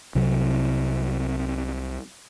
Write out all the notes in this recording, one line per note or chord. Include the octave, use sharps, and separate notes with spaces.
C2 C3 F#3